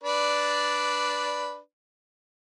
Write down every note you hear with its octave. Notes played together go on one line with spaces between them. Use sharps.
D4 B4 D5